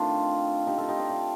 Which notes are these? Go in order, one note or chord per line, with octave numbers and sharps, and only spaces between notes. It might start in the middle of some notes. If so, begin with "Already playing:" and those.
Already playing: D#3 A3 C4 D4 F4
D#4 G4
F4 A4
D#4 G4
D5 F5
D5 F5